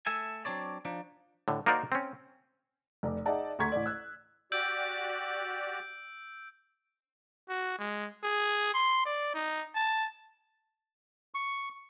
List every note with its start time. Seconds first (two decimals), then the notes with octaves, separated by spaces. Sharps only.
0.06 A3 A4 E5 G#5
0.45 F#3 C4 D4 C#5 D5
0.85 F3 D4 D#4
1.48 A2 D3
1.66 A#3 D#4 F#4 A#4 C5 D5
1.92 C4 C#4
3.03 F1 D5
3.26 D#4 G#4 D5 E5 F#5 A5
3.59 D2 A#5 C#6 G#6 B6
3.72 A1 D5
3.86 E6 F#6
4.52 F#4 G4 D5 E6 G6 D7
7.49 F#4
7.78 G#3
8.24 G#4
8.74 C6
9.05 D5
9.35 D#4
9.75 A5
11.34 C#6